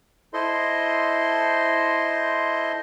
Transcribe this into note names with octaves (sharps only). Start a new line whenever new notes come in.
E4 A4 C5 D#5 C6